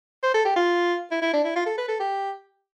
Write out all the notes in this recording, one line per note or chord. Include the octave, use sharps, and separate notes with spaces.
C5
A4
G4
F4
E4
E4
D4
E4
F4
A4
B4
A4
G4